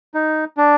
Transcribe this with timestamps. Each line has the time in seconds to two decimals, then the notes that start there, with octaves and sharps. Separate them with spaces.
0.14 D#4
0.57 D4